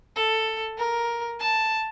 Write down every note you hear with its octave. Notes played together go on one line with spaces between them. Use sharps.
A4
A#4
A5